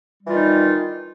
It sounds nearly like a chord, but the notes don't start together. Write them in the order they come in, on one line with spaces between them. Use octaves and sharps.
G3 E3 F4 D#3 D#4